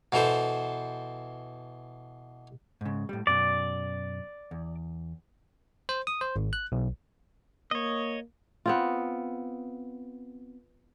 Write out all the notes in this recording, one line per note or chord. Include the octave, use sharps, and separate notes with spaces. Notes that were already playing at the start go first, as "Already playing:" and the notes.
B2 E3 A4 C5
G#2 C#3
A2 G3
F#2 B2 D5
E2
C5
D#6
C5
G#1
F#6
B1
A#3 C#5 D#5
B3 C4 F4